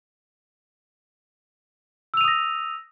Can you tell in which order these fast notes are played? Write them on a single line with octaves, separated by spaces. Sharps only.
E6 F7 D#7 D#6 A#6